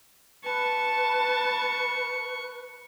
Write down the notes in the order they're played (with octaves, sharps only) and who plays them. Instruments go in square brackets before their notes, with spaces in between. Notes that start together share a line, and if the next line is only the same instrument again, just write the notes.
[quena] B4 [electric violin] A5 [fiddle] C#6